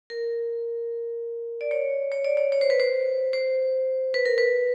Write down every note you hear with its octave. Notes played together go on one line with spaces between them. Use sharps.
A#4
D5
C#5
C#5
D5
C#5
C#5
C5
B4
C5
C5
B4
A#4
B4